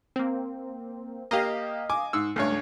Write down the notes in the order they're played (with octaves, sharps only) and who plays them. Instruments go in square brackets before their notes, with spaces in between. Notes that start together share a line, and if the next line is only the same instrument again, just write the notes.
[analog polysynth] A#3 C4
[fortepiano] A#3 G4 [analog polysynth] D#5 F5
[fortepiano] G#5 D6
G#2 E6
[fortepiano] C#2 G2 C#5 [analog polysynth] A3